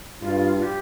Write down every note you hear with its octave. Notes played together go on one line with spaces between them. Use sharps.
G2 F4
F4
G4